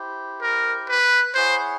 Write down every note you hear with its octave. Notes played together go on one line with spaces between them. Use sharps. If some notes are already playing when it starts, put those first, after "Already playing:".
Already playing: E4 G4 C5
A#4
B4
E4 G#4 C5 C#5 F#5